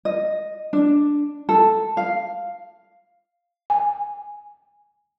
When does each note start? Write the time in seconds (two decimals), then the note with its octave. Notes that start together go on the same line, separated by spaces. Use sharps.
0.05 D#5
0.73 D4
1.49 A4
1.97 F5
3.70 G#5